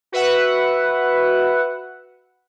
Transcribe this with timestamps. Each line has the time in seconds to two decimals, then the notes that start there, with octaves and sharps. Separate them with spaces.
0.12 F#4 B4 E5 F#5